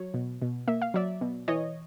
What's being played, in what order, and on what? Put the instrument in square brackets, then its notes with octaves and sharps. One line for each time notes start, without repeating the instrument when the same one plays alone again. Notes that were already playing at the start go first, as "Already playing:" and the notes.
Already playing: [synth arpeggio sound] F#3 C#5
B2
B2
A#3 E5
F5
F#3 D5 E5
B2
E3 C#5 D#5